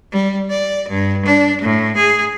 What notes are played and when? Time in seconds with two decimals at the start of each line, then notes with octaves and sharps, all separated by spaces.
0.12 G3
0.50 D5
0.89 G2
1.25 D4
1.61 A2
1.96 G#4